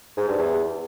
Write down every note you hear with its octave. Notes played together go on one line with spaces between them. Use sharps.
G#2
G2
E2